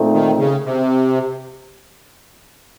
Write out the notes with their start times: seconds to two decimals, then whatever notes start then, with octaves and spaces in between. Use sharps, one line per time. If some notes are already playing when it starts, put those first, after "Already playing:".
Already playing: A#2 A3 C4 D#4
0.13 D#3
0.38 C#3
0.65 C3